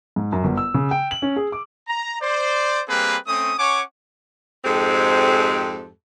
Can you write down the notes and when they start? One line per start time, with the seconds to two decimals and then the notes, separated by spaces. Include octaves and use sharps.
0.16 G#2
0.32 F#2
0.44 G1
0.57 E6
0.74 C#3
0.91 G5
1.11 F#7
1.22 C#4
1.36 G#4
1.52 D6
1.88 A#5
2.21 C5 D5
2.88 G3 A#3 C4 G#4 B4
3.27 A3 C4 C#4 D#6
3.57 C#4 C#5 F#5 G#5 C#6 D6
4.65 F2 G#2 G#3 C4 G4 A4